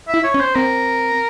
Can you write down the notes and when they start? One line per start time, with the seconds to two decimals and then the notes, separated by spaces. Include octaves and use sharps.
0.08 E5
0.14 E4
0.24 C#5
0.34 C#4
0.40 C5
0.55 C4 A#4